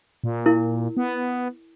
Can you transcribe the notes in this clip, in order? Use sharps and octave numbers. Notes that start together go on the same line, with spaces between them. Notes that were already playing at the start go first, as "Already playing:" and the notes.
A#2
E4 A#4
B3